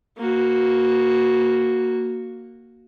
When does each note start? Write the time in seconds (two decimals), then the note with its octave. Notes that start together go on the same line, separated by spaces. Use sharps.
0.17 A#3 F#4